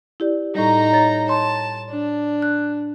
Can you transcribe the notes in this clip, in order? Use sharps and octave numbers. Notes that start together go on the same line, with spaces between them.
E4 G4 D5
A2 G3 D#4 A#5
C#5 A6
C#5 A5 C6
D4
F#6